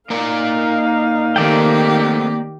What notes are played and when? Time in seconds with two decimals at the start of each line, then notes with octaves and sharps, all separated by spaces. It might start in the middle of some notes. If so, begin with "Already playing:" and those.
0.10 A#3 D#4 A#4 D5 F5
1.36 D#3 A3 A#3 C4 G4 D5 G5